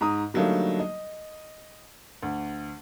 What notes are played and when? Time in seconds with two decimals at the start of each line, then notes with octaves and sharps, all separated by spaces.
0.01 G#2 A#5 D#6
0.34 D3 F#3 G3 A3 A#3 D#4
0.79 D#5
2.23 D2